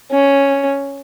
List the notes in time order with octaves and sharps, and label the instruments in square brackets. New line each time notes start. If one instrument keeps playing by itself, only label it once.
[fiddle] C#4